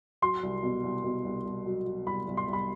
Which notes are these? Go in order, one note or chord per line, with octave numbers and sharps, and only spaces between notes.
F#3 C6
C2
B2
C2
B2
C2
C2
F#3
F#3
C2 B5
C2
C6
C2
B5